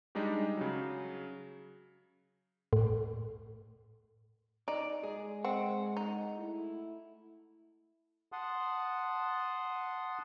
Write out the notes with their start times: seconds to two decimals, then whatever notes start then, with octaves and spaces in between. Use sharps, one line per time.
0.15 G3 G#3 D4 D#4 G4
0.57 C#3 F#3
2.73 A2
4.68 D#4 D5
5.03 G#3 G#4
5.45 C4 F#5
5.97 D#4
6.37 A3 E4
8.32 F#5 A5 C6 D#6